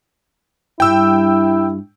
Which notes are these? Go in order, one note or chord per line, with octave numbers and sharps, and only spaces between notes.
G2 E4 G4 G5 E6